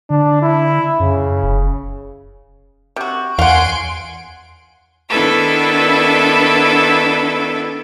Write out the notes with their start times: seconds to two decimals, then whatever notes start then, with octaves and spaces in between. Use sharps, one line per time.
0.10 D3 D4
0.42 E4
1.00 F#2 C#3
1.43 F1
2.96 C3 F#4
3.39 E2 F5 F#5 G#5 C6 D7
5.09 D#3 B3 D4 E4 A4 B4